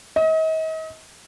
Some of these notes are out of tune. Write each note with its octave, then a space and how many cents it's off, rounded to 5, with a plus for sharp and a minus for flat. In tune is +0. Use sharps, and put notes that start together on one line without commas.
D#5 +40